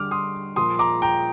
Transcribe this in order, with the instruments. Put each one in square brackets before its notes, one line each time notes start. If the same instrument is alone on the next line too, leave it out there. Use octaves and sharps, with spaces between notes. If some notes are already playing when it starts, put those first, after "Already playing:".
Already playing: [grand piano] D3 G3 D6 F6
C6 D#6
A#2 F3 C6 D#6
A#5 D6
G5 A#5